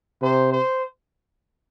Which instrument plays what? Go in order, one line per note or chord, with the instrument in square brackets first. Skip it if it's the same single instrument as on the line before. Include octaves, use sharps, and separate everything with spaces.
[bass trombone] C3 [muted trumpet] C5
[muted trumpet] C5